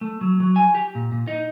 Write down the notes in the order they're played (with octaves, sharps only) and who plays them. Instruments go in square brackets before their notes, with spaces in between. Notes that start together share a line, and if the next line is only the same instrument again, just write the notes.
[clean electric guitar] A3
F#3
F#3
G#5
G4
A#2
A#2
D#4